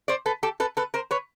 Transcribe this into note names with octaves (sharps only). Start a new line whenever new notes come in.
C5 D5
A4 B4
G4 A4
A4 B4
A4 B4
A#4 C5
B4 C#5